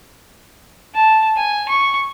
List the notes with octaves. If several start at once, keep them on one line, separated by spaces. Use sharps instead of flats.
A5
G#5
C#6